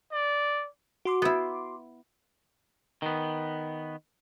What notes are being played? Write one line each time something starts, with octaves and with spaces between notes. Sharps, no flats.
D5
F#4 C6 D6
B3 E4
D#3 B3